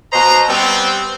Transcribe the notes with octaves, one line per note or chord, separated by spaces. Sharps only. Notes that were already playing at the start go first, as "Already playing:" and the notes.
B2 C5 D#5 A#5
G3 B3 C4